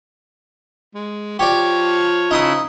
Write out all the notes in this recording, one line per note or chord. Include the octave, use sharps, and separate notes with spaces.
G#3
F3 G4 C#5 D5
C#3 D#4 E4 C6 D#6